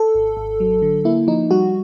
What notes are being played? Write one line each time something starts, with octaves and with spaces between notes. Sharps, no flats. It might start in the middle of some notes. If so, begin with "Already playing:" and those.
Already playing: A4
G#1
G#1
F#3
D3
A#3 E4
F3 D#4
G3 F#4